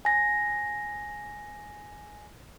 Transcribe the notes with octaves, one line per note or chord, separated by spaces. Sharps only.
G#5 A#6